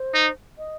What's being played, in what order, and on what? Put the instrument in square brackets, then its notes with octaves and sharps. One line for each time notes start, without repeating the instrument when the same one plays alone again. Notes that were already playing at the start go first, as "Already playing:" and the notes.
Already playing: [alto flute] C5
[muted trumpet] D#4
[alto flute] D#5